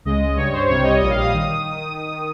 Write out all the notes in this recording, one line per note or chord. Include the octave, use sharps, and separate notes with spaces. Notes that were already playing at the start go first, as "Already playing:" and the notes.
C#2 C#3 G#3 D#5
D#5
G2 G3 C#5
C5
C2 C3 G3 C#5
D#5
A#1 A#2 G3 D#5
F5
D#6
D#3